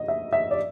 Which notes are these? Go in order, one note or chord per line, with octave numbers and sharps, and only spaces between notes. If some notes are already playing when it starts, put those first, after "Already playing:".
Already playing: D#5
E5
E5
D5